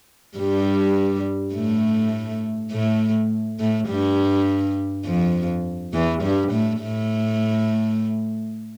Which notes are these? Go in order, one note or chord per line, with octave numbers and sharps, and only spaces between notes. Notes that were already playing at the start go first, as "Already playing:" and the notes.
G2 G3
A2 A3
A2 A3
A2 A3
G2 G3
F2 F3
E2 E3
G2 G3
A2 A3
A2 A3